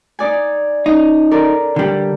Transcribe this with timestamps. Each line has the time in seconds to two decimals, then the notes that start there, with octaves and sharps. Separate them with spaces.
0.19 D#4 D5 G#5
0.86 C#4 D#4
1.31 A4 A#4 D5
1.76 D3 G3